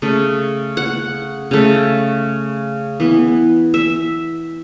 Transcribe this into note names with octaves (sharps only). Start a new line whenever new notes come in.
C#3 A3
F#5
C#3 A3
E3 B3
E5